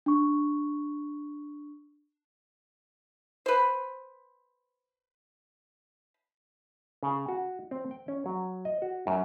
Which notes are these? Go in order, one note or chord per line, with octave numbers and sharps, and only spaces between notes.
D4 C#6
B4 C5
C#3
F#4
C4
G5
C#4
F#3
D#5
F#4
F#2